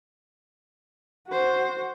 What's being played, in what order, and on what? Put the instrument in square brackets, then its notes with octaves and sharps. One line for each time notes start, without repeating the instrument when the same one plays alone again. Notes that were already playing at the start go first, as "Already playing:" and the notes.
[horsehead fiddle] F#4 C5